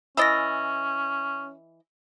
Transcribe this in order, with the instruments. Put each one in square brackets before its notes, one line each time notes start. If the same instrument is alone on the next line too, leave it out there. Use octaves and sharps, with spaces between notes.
[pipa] E3 E4 D#5 [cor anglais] C#4 [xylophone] E6 A6 A#6